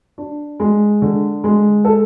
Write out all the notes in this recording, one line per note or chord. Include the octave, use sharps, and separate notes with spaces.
D4
G#3
D3
G#3
A4